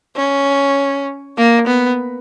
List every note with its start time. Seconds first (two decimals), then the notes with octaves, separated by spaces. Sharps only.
0.16 C#4
1.37 A#3
1.67 B3